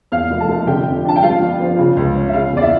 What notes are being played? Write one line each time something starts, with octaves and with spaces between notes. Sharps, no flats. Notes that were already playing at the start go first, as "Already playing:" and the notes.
E2 F5 F6
F1
A4 A5
F1
D3 G4 G5
F2
D4 A5
G5
G2 F4 F5
G1
F3
C#3
C#2
C#4
E5
C#3 F4 F5
E2 D5
E4 E5